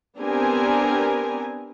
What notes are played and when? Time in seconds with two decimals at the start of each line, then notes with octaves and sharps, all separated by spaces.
0.19 B3 C4 D4 G4 A#4 G#5